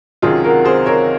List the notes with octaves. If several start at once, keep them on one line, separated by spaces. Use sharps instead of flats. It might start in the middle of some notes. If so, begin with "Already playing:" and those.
C#2 C3 D#3 F#3 C4 F4 G#4
F#4 A#4
G#4 C5
A#4 C#5